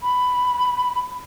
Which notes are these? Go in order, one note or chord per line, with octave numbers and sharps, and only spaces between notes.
B5